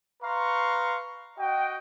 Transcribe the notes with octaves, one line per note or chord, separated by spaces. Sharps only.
B4 F5 A#5 C6 C#6
F#4 D#5 G5